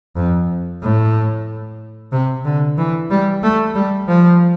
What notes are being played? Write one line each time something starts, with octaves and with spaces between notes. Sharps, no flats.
F2
A2
C3
D3
E3
G3
A3
G3
F3